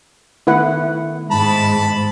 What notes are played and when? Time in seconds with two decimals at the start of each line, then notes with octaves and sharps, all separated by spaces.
0.47 D#3 A3 B3 E4 B4 F#5
1.31 G#2 A5 B5